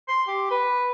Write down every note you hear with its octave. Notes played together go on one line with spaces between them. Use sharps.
C6
G4
B4